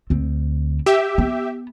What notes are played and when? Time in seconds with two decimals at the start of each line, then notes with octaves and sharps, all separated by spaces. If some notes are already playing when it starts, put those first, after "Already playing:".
0.10 D2 C4
0.86 G4 E5
1.18 B3